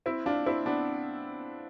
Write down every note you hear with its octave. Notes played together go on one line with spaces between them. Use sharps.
C4 E4
D4 F4
C4 E4
B3 D4